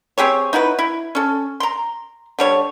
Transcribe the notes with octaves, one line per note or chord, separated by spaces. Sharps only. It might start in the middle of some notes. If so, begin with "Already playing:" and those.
C4 G4 G#4 C#5
D#4 E4 F#4 B4
E4
C#4 A4
A#5 C6
D3 G3 C#5